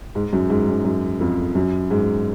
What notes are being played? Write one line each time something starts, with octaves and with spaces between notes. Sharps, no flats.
G#2
F#2
G#2
F#2
F#2
F2
F#2
G#2